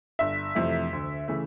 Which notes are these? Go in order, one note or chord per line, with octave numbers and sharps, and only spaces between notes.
G1 E5
F2 C3 E3 A3
D2
C#3 E3 A3